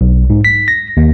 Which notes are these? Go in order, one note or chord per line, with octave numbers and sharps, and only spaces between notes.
B1
G#2
B6
A#6
D#2